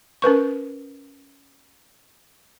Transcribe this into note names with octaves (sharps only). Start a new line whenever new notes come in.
C#4 A#4 B4 C#6